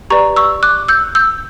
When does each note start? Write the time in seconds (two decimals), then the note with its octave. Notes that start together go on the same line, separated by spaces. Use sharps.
0.10 G4 B4 D5 A#5 C#6
0.36 C#6 E6
0.63 D6 F#6
0.88 E6 G6
1.15 E6 G6